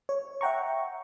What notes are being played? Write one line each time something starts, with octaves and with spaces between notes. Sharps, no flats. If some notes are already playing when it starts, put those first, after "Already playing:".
C#5
E5 F#5 G5 A#5 C#6